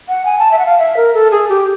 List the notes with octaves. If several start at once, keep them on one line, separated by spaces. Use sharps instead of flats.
F#5
G#5
A5
E5
F#5
F5
E5
A#4
A4
G#4
G4